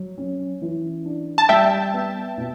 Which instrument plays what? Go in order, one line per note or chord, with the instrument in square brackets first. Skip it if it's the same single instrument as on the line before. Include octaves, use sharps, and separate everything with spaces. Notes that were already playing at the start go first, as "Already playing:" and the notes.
Already playing: [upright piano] F#3
C#4
E3
D4
[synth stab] A5
[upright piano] G3 [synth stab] E5 G5
[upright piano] B3
B2